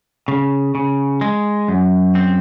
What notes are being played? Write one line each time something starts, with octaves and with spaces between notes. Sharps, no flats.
C#3
C#3
G#3
F#2
C4